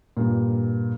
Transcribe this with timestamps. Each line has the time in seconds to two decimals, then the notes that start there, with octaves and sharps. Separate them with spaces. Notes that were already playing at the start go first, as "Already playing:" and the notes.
0.17 G2 A#2